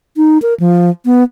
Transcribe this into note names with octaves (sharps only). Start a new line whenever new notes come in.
D#4
A#4
F3
B3